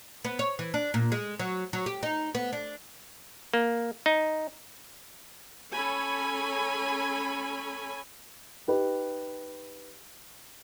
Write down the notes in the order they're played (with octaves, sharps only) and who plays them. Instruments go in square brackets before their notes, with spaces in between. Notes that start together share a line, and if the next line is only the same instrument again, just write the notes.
[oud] B3
C#5
E3
D4
A#2
G#3
F#3
F#3
G4
D#4
B3
D4
[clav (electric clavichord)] A#3
D#4
[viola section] C#4 A4 C#5 G#5 B5
[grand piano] D#4 G4 B4